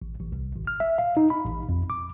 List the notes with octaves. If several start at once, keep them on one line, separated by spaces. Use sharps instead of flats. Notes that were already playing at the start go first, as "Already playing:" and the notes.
A1
A1
C2
G#1
F6
E5
F5
D#4
B5
A1
F2
D6